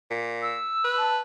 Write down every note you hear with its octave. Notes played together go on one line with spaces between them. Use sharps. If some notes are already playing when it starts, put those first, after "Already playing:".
A#2
E6
B4
A5